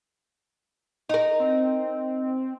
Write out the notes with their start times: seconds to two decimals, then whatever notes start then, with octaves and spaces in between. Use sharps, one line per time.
1.09 D#4 A#4
1.39 C4